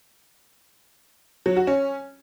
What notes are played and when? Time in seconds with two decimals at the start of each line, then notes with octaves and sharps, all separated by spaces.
1.46 F#3
1.57 F#4
1.67 C#4